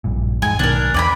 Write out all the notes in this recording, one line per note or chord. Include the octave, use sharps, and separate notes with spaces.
A#1 G2 A#2
E2 G#2 G#3 G#5
B1 D#3 B3 D4 A#4
E2 D5 G#5 B5